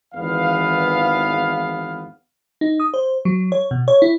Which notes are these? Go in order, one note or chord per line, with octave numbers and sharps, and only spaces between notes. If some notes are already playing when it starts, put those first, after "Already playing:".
G#1 E2 E3 B3 F5
D#4
D#6
C5
F#3
C#5
B2
C#5
E4